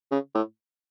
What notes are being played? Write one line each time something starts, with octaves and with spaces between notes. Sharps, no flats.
C#3
A2